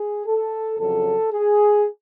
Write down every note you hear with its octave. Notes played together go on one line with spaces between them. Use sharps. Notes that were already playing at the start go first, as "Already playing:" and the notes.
Already playing: G#4
A4
F2 C#3 F#3 A4
G#4